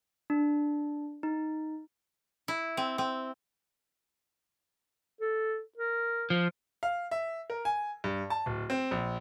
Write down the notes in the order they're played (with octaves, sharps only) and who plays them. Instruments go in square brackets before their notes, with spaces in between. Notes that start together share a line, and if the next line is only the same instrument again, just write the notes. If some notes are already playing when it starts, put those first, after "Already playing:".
[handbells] D4
D#4
[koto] E4
C4
C4
[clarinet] A4
A#4
[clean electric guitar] F3
[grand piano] F5
E5
A#4
G#5
G2
A5
D1
C4
A#1